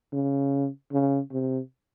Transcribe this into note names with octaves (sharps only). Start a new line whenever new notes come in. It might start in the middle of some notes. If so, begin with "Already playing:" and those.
C#3
C#3
C3